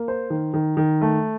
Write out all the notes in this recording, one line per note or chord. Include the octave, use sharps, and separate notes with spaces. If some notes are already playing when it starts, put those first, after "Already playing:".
Already playing: A#3
C5
D#3
D#3
D#3
A3